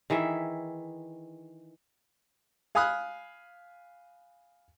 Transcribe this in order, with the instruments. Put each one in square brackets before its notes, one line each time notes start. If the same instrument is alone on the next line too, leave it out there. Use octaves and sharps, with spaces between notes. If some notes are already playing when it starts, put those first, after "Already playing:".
[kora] D#3 E3 G#4 E5
[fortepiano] F5 G#5 B5 D#6 F6 F#6